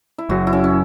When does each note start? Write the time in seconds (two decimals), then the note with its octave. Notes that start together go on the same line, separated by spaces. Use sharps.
0.18 E4
0.29 F#1 F#2 F#3 F#4
0.47 E4
0.53 C#4
0.64 C#4